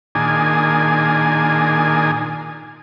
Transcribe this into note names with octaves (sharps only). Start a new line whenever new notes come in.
A#2 D#3 D4 G#4 G#5